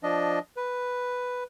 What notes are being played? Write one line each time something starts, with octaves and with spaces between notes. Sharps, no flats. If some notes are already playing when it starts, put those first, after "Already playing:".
F3 D4 D#5
B4